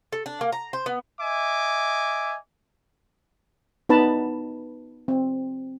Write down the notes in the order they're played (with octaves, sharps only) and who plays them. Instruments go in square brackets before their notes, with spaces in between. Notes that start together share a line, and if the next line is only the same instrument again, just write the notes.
[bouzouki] A4
D4
A#3
A#5
C5
B3
[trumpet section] D#5 E5 G#5 D6
[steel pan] B3 D#4 B4 A5 B5
C4